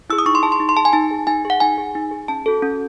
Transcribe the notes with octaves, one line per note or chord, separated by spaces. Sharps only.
E4 G#4 E6
D#6
D#4 C#6
C6
G#4 A5
C6
D#4
C6
G#4 A5
G#5
D#4 A5
G#4
D#4 G#5
G#4
F#5
D#4 G#5
G#4
D#4
G#4
C#4 A5
F#4 A4
C#4